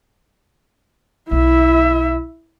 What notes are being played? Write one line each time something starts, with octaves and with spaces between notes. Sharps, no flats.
B1 D3 E4 E5